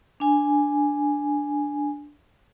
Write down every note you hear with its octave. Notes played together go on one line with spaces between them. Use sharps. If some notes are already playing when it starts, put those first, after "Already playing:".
D4 G#5